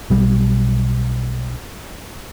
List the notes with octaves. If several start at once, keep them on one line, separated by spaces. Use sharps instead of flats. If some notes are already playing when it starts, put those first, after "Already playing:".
B1 G3